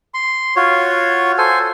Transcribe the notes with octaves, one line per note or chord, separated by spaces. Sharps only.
C6
F4 F#4 C#5
A4 C5 G#5